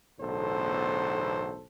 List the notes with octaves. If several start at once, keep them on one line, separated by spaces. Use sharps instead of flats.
B1 E2 A2 D3 A4 C5